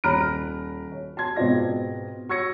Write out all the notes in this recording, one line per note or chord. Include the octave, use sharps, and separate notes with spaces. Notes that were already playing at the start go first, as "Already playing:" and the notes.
D#1 A#5 B5 F6 F#6 D7
C#5
A5 C6 G#6
G#2 B2 C4 F4 D5 A#6
C#6 E6 G#6 A#6 C#7